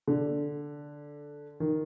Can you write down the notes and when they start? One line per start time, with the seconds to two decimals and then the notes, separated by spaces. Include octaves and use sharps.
0.07 D3
1.60 D#3